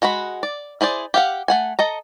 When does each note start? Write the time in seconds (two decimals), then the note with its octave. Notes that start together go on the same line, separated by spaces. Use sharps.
0.02 G#3 F#4 F#5 B5
0.43 D5
0.81 E4 G#4 C5 D5
1.14 G4 F5 F#5
1.48 A3 F#5 G#5
1.79 A4 D#5 A#5